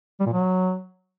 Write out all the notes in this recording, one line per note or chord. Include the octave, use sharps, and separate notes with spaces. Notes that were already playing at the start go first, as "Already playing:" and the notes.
G3
A#2
F#3